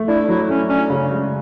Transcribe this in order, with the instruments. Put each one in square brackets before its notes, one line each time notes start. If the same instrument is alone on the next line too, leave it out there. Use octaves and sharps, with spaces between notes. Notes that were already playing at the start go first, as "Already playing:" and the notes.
Already playing: [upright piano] A3
[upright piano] D4 [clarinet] E4
[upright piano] F#3 [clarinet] E4
[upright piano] A3 [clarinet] C#4
[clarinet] C#4 [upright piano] D4
[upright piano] C#3
G#3